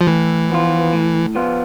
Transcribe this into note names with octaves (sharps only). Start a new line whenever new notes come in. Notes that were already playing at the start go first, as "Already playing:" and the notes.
F3
A2 E3
F3 B3 F4
A2
F3 B3 F4